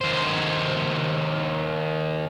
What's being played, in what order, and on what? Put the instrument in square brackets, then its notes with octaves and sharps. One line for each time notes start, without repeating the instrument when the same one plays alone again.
[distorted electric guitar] D#2 C5